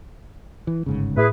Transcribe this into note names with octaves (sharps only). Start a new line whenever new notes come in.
E3
G1 G#2 C#3
A2 E4 G#4 B4